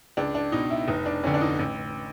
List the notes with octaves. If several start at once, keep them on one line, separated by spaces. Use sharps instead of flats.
C#2 D4
D4
B2 D#4
E4
F1 D#4
D4
F2 D3 C#4
D4
D#4
A1